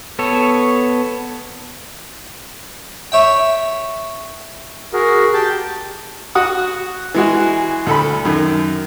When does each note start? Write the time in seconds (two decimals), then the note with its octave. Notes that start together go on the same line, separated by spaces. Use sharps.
0.19 B3 A4 C#5
3.12 C#5 E5 G5
4.93 F#4 G#4 A#4
5.34 G4 G5 A5
6.35 F#4 F#5 D#6
7.14 E3 G#3 F#4
7.87 D2 A4 B5
8.25 F#2 D#3